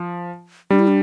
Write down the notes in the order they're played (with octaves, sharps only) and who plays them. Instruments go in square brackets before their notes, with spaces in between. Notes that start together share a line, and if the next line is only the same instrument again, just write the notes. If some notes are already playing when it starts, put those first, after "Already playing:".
Already playing: [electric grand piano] F3
[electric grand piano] G3 [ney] D4
[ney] E4
D4